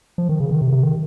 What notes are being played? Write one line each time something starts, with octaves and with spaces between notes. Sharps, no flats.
F3
D#3
C#3
D#3
C3
C3
D#3